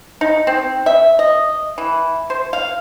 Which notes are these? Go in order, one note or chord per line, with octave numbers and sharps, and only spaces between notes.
D#4
C4
E5
D#5
E3
C5
F5